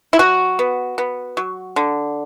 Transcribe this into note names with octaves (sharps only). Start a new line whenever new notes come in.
E4
F#3 F#4
B3
B3
F#3
D3